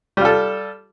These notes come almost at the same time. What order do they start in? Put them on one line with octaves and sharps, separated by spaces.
G3 F4 A4